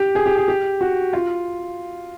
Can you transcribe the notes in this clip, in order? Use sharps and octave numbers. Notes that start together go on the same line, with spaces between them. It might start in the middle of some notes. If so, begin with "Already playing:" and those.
Already playing: G4
G#4
G4
G#4
G4
F#4
F4